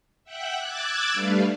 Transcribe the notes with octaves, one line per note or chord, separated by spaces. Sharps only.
E5 F#5 G5 F#6
D6 E6 F#6 G#6 A6
G3 A3 D4 B4 F5